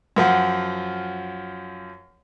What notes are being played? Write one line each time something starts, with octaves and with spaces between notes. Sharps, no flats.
F#2 F3 F4 F#5